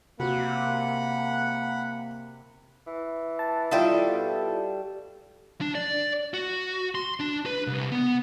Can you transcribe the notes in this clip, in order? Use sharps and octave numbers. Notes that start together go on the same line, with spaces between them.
C3 A#3 F#4 F#5 B5
E3
A5
D#3 G3 D4 E4 F4 A4 E5
B2
D4
D5
F#4
C6
D4
B4
C2
B3